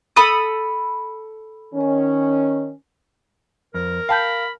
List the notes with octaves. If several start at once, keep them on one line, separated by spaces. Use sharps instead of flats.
A4 B5 D#6
D#3 C#4
F2 A#4
F5 G5 A5 B5 G6